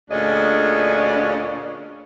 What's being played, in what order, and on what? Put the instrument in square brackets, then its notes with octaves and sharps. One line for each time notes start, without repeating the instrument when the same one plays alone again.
[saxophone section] D2 A#2 C#4 D4 G#4 D#5